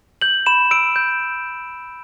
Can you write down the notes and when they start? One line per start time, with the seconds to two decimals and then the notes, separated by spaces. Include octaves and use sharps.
0.22 G6 F#7
0.46 B5 E7
0.71 E6 D7
0.96 G6